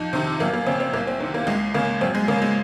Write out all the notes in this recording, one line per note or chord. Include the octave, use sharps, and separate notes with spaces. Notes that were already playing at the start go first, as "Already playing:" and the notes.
Already playing: F2 D#4
C3 D#3
F#2 A#3
A#3
C#3 C4
C4
C2 A#3
C4
C3 D#3 C4
A#3
C#2 G#3
C#3 A#3
F#2 C4
G#3
C#3 A#3
G#3